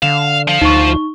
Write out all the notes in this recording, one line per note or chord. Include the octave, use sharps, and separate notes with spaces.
D3 F5 E7
F3 F4
D2 D#4 C#6